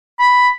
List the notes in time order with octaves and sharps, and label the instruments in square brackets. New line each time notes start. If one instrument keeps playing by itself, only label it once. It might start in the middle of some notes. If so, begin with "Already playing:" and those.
[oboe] B5